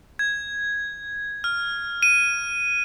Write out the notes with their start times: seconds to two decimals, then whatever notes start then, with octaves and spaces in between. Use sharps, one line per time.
0.19 G#6
1.44 F6
2.03 D#7